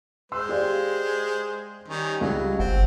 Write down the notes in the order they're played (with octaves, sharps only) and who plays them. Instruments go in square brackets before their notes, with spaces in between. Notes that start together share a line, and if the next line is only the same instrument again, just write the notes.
[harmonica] G#3 C5 [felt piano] C6 E6
[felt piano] G4 D5 F5
[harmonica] D#3 G3 C#4
[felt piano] C#2 G3 [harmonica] F#3
[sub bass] G1 [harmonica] C4 [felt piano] F#5